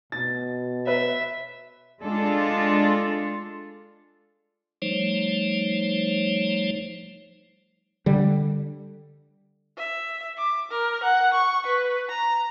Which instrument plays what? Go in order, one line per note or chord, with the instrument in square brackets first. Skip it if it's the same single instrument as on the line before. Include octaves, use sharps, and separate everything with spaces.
[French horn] B2 [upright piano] A6
[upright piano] B4 [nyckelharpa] E5
[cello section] G#3 D4 F4 A4
[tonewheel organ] F3 G3 A3 D#4 C5 C#5
[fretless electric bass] D3 G3
[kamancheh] E5
D6
A#4
F#5
C#6
B4
A#5